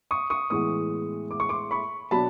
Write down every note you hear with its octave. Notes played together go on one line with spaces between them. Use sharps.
C#6 D#6
C#6 D#6
A2 E3 G#3 B3 C#6 D#6
D6
C#6
C6 D6
B5 C#6
B2 F#3 B3 D4 A5 B5